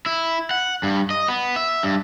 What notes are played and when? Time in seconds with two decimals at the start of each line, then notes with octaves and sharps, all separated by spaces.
0.06 E4
0.51 F#5
0.83 G2
1.10 D#5
1.28 B3
1.56 E5
1.83 G2